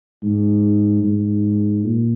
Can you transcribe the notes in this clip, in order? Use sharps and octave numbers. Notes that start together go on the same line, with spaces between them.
G#2
G#2
A#2